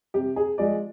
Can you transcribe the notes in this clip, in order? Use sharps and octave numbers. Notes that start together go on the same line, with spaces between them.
C3 G4
G#4
F3 G#3 D5